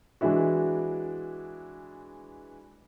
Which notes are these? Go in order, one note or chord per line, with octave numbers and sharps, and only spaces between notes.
E3 G#3 D4 E4 F#4